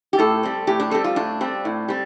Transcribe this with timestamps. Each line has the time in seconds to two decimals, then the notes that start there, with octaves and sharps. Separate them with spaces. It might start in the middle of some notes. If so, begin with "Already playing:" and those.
0.13 G4
0.19 A2 A4
0.43 G3 C4
0.67 A2 G4
0.80 D4
0.91 G3 C4 A4
1.04 F4
1.16 A2 D4
1.41 G3 C4
1.65 A2
1.88 G3 C4